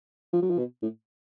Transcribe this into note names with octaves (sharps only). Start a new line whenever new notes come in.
F3
F#3
F3
B2
A2